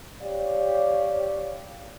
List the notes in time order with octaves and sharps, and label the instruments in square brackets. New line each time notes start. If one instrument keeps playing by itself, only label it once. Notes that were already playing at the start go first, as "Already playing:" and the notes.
[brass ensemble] G4 C#5 D5 F5